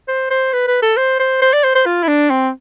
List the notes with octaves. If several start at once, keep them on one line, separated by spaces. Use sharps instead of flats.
C5
C5
B4
B4
A4
C5
C5
C5
D5
C5
C5
F4
E4
D4
C4